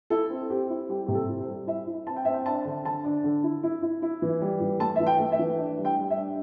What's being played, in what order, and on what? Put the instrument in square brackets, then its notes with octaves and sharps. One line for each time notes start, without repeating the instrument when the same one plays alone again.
[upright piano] E4 A4
C4
C4 G4
E4
G3 G4
C3 G4
A4
E4
C5
G3
E4 E5
E4
C4 A5
G5
C4 E5
G5
D4 A5
D3
D3 A5
D4
D3
E4
E4
E4
E4
E3
G3
E3
A3 A5
E3 E5
G5
A3
E5
E3
D4
G3
G5
G3
E5
D4